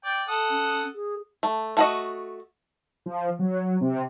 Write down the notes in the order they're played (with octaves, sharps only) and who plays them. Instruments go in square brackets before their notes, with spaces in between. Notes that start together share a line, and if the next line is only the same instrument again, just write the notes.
[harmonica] D5 G5
A4 F#5 D#6
[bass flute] C#4
G#4
[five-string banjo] A3
A3 F#4 D#5
[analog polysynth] F3
F#3
C3